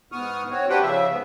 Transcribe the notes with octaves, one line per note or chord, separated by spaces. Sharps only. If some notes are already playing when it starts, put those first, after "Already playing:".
G#2 B3 C#6 D#6 F6
C4 F#4 C#5
D4 G4 B4 C5 F#5 G5
C#3 F3 E5
G#2 B3